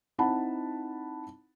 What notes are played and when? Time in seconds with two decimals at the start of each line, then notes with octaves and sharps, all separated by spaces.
0.18 C4 D#4 E4 F#5 A5 B5